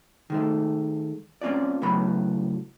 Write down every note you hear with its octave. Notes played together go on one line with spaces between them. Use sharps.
D#3 G#3 A3
A#3 C4 C#4 F4 D5
C#2 A2 F#3 B3 B5